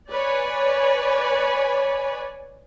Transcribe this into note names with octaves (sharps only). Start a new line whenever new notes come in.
B4 C#5 D5 G#5